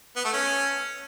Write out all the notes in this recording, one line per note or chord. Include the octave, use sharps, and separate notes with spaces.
B3
A3
C#4